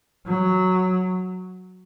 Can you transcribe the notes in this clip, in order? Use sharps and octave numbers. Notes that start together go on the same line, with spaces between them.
F#3